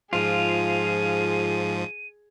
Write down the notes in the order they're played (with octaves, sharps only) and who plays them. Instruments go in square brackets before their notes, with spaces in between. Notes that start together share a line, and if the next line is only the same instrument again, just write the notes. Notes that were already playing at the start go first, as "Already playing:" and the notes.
[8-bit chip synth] G#2 F3 [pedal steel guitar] F4 [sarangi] G#4 [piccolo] D#7